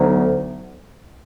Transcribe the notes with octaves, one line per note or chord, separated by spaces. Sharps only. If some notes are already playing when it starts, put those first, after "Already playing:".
Already playing: D2 D3 F#3 B3 D#4